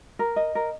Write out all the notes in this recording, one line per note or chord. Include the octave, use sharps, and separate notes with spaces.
A#4
D#5
A#4